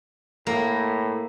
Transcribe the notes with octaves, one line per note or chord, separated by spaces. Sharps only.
A2 A#3